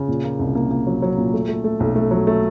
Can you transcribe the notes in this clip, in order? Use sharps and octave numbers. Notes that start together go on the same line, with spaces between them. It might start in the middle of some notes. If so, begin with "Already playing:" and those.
Already playing: C#3
A#2
A#3
C2
A#3
A#3
F#3
F#3
A#2
A3
A3
A3
B1
A3
F#3
A3